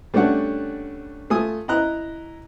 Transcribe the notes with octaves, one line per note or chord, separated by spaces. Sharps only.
G3 A3 C#4 D4 F#5
A3 F4 G#5 D#6
E4 D#5 A#5 F#6